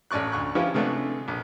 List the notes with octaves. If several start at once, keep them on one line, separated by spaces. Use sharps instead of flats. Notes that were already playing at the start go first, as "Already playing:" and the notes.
A1 C#4 D5 C#6 F#6
D2 C#6 F#6
F3 C#4 E4 F4 G4 B4
C3 G#3 A3 B3 C#4 D4
A#1